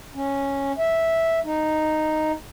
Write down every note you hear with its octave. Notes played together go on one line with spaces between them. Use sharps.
C#4
E5
D#4